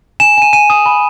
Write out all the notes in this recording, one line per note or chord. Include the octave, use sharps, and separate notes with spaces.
G#5 E7
G#5 D#7
G#5 D#7
D#6
B5